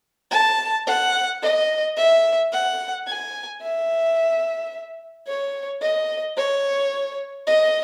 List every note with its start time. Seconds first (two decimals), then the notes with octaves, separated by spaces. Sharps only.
0.31 A5
0.87 F#5
1.42 D#5
1.97 E5
2.52 F#5
3.07 G#5
3.62 E5
5.27 C#5
5.82 D#5
6.37 C#5
7.47 D#5